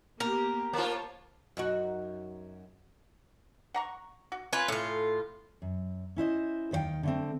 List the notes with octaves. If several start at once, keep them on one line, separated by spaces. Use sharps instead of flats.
A#3 B3 G4 A#4
A#3 F4 C5 C#5 A5
F#2 D#4 F#4
F#5 A#5 C#6
F#4
F4 B4 C#5 G#5
A2 F4
F#2
C#4 E4 C5 D#5
D#2 D#3 C5 F5 G5
D3 A3 C4